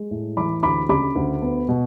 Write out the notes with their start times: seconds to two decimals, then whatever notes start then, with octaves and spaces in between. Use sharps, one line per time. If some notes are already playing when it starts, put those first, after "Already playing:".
Already playing: G#3
0.11 A2
0.37 E3 B5 D6
0.63 D2 B5 D6
0.89 C#3 B5 D6
1.16 D2
1.42 B3
1.68 B2